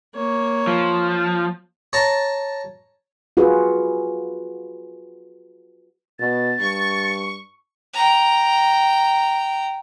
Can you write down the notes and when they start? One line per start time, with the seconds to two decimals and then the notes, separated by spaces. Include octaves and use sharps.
0.15 A#3 C#5
0.67 F3
1.93 C#5 A5 A#5
3.37 F4 F#4 G#4 B4
6.19 B2 A6
6.60 G2 C#6
7.94 G5 A#5